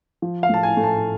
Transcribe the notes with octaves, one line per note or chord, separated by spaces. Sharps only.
F3
F5
A2 A5
G#5
A3
A5